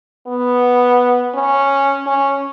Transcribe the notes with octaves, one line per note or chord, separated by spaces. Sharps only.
B3
C#4
C#4